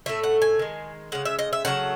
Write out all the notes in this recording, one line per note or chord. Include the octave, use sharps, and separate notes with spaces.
A2 F#3 A3 E5
F#5
G#5
D#3 G#3
C#3 G#3 F#5
E5
D#5
E5
C#3 F#3 A3 F#5